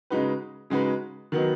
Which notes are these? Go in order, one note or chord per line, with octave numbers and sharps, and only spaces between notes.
C#3 G#3 D#4 F#4 B4
C#3 G#3 D#4 F#4 B4
D#3 F#3 B3 D#4